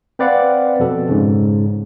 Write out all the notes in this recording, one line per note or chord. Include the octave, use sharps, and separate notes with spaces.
C4 B4 D5 F5 F#5
F2 B2 A4
G#2 C#3